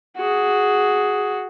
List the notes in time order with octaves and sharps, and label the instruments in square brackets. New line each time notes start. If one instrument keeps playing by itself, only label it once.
[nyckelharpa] F#4 G#4